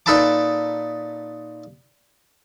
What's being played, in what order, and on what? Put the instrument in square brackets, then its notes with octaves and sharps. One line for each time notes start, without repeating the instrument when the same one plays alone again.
[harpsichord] A#2 D#4 A4 B4 A5 D6